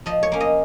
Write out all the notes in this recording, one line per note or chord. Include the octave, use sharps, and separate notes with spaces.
F3 D#5
C#5
A#3 C#4
D#5